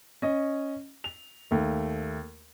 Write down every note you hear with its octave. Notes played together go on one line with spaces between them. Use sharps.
C#4 D#5
F7
D#2 A3